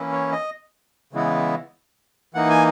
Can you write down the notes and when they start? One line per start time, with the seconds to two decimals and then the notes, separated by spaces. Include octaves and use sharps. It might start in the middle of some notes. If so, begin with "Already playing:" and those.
Already playing: E3 A#3 C#4 E4
0.12 C#5
0.32 D#5
1.13 C#3 E3 G#3 B3 E4
2.34 E3 A#3 D#4 F#5
2.50 G#5